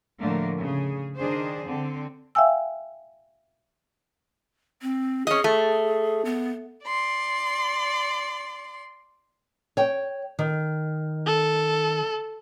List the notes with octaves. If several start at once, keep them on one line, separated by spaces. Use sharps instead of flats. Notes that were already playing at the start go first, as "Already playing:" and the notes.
A2 D3 F3 A3 A#3
C#3 G#4
D#3 D4 G#4 C5
D3 C4
E5 F5 G5 G#5 E6
C4
C#4 G#4 D#5
A3
B3
D5 C6
C#5 G5
D#3
A4